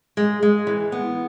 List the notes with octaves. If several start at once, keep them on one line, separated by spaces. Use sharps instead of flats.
G#3
G#3
E3
B3